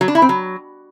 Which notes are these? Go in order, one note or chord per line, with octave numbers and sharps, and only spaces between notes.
F#3
D4
E4
C4
F#3